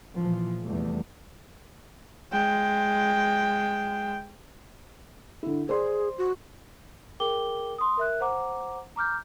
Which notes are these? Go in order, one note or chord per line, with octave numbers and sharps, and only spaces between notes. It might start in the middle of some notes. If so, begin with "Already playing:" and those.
A#2 E3 F3
F1 E2 G3 A3
G#3 G5
D3 E4
G#4 C5 D5 C6
F#4
G#4 A#4 G5 D6 G7
C6 D#6
A#4 E5 F#6
C5 F#5 A#5 D6
A#5 D6 F6 G6